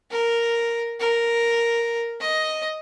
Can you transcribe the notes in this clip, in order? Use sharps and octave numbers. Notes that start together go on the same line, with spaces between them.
A#4
A#4
D#5